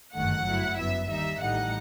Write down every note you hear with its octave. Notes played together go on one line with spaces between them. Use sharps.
G1 F#2 D#3 A3 F#5
G1 F#2 F#3 A3 E4
G1 F#2 F#3 B3 E5
D#2 D#3 G3 D#4 E5
A1 A2 G3 D#4 F#5